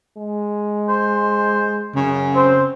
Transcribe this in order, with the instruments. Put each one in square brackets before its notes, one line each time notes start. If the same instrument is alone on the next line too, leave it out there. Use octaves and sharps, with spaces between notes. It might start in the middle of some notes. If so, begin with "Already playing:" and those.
[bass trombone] G#3
[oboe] C5
[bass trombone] F#2 [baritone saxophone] C#3
[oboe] C4 [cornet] C5